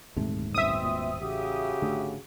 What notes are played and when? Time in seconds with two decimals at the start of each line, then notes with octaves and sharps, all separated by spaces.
0.16 D#1 D2 G#2 C3 A3
0.54 B1 F#2 B2 C4 E5 D#6
0.85 A#2
1.21 A1 C#3 F#4 G4
1.82 G#1 D3 A3